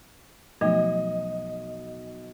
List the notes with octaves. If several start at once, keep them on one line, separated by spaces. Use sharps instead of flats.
B1 F3 A3 D#5